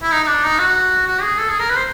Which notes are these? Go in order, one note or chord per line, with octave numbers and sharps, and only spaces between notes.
E4
D#4
D#4
D4
D#4
F#4
F#4
G#4
A4
G#4
A#4
B4
C5